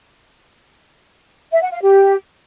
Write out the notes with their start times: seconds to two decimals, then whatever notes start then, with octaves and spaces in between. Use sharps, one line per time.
1.52 E5
1.62 F#5
1.72 F5
1.82 G4